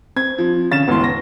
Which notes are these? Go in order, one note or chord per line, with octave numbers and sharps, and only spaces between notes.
C4 G#6
F3
D3 C#4 F5 A6 E7
E1 A2 B3 C6
A#6